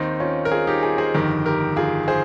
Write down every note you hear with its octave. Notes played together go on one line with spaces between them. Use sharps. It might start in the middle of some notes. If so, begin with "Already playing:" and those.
Already playing: D#2 D#3 C4 D#4
C#4 F4
A#4
F4 G#4
D#4 G4
F4 G#4
G#4 C5
G1 F2 D#3 G4 A#4
G4 A#4
F4 G#4
G#4 C5